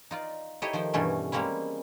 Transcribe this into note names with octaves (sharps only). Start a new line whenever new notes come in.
D#4 F4 D5
D#4 E4 G4 A4 C#5 D#5
D#3 F3 C5 G5
G2 B2 E3 A3 C#4
G3 G#3 A#3 C4 C#4 E4